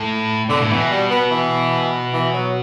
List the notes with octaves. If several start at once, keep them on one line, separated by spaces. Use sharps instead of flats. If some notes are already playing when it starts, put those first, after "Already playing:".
Already playing: A2
B2 D3
A2
B2 E3
G3
B3
E3
E3
F#3